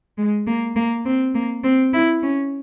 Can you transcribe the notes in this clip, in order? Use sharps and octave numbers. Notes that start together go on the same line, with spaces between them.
G#3
A#3
A#3
C4
A#3
C4
E4
C#4